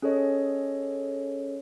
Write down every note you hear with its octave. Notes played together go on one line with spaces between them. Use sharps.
C#4 G#4 A4 C#5 D#5